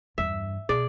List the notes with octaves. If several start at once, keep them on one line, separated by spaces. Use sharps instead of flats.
E2 G2 E5
B2 G#4 D5